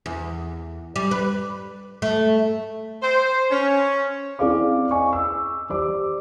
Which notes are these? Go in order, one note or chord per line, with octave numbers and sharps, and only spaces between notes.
E2
G3
B4
A3
C5
C#4
C4 E4 G#4 D5 F5 D6
D#5 G#5 C#6
E6
G3 C5 D5 D6